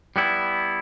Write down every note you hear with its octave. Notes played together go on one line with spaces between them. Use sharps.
G3 B3 E4